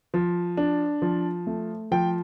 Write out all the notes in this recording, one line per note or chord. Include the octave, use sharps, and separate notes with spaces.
F3
D4
F3
A3
F3 G5